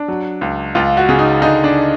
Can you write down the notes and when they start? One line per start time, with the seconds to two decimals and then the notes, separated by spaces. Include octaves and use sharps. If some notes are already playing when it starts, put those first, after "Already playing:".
Already playing: D4
0.08 F#3
0.41 C#2
0.75 C#2 F4
0.97 F#4
1.09 C#3
1.19 D#4
1.42 D3 D#4
1.64 D4